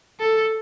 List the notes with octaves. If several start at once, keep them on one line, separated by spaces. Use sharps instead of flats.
A4